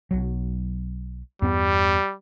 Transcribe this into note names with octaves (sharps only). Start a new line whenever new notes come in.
B1 F#3
E2 G2 G3 B3